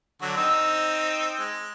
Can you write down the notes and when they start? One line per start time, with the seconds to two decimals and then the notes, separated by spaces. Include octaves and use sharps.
0.22 D3 F#3 F#4
0.37 C4 D#4 E6
1.39 G#3